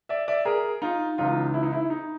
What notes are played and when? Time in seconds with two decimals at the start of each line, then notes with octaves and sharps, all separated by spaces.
0.09 D5 E5
0.28 D5 E5
0.45 G#4 A#4
0.82 D#4 F4
1.18 C#2 C#3 E3 D#4 F4
1.54 E4
1.63 D#4
1.73 E4
1.90 D#4